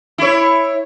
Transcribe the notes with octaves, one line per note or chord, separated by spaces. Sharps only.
E4 C#5